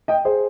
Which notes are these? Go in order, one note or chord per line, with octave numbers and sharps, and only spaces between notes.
D#5 G5
G#4 C5